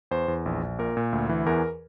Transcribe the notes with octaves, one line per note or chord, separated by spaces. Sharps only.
E2 C5
E2
A#1
A#1
A#2 A#4
A#2
D2
E3
E2 A#4